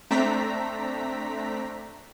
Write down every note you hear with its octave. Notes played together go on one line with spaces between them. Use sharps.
A3 C4 D4 A#5 B6